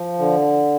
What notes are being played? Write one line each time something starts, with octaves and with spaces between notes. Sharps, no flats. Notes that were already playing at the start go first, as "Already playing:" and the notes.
Already playing: F3
D3